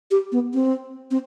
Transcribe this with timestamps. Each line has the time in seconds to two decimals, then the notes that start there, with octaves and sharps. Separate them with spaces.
0.11 G4
0.32 B3
0.54 C4
1.11 C4